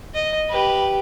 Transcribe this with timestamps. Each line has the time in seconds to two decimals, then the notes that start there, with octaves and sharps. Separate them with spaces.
0.14 D#5
0.49 G4 B4